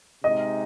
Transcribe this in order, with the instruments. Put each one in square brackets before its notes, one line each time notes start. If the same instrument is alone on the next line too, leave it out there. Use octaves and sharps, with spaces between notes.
[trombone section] C3 G#3 D#4 [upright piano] D#5